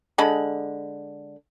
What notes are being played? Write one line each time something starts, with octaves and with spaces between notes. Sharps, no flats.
D3 G#3 B5